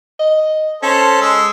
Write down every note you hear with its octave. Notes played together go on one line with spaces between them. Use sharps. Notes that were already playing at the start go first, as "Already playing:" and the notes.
D#5
C#4 A4 C5
G#3 E6